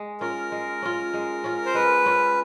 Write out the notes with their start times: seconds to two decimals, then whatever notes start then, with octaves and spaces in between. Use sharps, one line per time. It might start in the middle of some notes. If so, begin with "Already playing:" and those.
Already playing: G#3
0.21 C#4 F4 A#4
0.52 G#3
0.82 C#4 F4
1.14 G#3
1.44 C#4 F4
1.66 C5
1.74 G#3 B4
2.06 C#4 F4